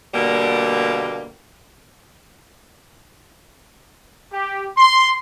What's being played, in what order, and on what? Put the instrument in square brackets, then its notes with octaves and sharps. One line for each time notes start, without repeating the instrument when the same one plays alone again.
[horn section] B2 D3 G3 A#3
G4
C6